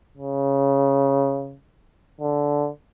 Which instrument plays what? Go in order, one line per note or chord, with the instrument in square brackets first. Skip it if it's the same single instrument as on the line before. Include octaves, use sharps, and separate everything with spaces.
[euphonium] C#3
D3